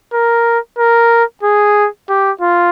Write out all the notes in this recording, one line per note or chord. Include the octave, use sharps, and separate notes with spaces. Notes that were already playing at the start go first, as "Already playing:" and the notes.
A#4
A#4
G#4
G4
F4